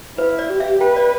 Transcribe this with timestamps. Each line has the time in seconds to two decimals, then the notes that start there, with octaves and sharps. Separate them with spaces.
0.18 E4 B4
0.39 D5
0.49 G4
0.60 E5
0.81 B4 G5
0.96 D5